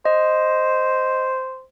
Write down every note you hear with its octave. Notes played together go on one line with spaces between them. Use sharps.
C5 D#5